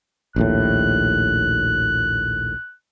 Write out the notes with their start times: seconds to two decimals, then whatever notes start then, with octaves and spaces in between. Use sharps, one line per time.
0.36 A#1 D#2 A2 F#6